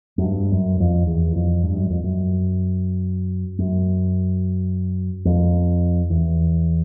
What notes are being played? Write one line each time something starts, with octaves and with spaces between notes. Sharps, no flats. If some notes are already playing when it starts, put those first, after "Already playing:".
F#2
G2
F#2
F2
E2
F2
G2
F#2
F2
F#2
F#2
F2
E2